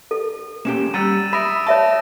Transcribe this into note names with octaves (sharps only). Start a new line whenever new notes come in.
A4
A#3 C#4 G4 E7
G3 F#5 A#5 E6 A6 D#7
E5 B5 D#6 A#6 D7
C#5 E5 A5 C#6